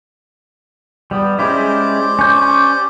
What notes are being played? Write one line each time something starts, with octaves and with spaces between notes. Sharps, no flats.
G3 B3
G#3 C#4 E4 G4 C5 D5
C#4 G6